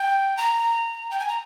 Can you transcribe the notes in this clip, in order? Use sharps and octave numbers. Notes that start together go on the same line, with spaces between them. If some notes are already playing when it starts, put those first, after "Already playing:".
Already playing: G5
A#5
G5
G#5
A#5